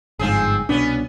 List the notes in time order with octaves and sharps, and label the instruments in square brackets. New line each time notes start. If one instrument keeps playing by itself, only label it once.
[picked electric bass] G1 G#2 [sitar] F3 C4 G#4
[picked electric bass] C2 B2 D4 [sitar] B3 C#4